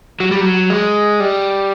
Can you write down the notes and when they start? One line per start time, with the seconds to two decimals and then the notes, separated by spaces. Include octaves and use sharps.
0.20 F#3
0.31 G3
0.41 F#3
0.70 G#3
1.20 G3